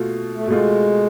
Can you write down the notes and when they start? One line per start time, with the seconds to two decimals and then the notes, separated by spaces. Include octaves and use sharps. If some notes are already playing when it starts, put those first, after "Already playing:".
Already playing: B2 A3 F4
0.34 A3
0.48 B2 G#3 A3 F4